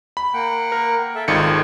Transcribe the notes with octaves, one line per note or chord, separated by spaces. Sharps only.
B5
A#3 F#5 G5
A#4
A4 E5
G#1 D#3 F4 G#4 A4 C#7